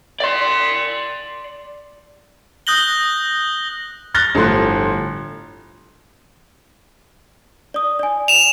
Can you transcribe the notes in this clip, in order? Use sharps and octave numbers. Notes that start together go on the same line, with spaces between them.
D5 C6
D#6 F#6 G6 A#6 F#7 G7
F6 F#6 A6 A#6 G7
G1 A2 F3 C6 F#6
D5 D#6
D5 G#5
E7 F7